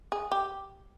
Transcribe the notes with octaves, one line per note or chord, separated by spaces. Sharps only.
G#4
G4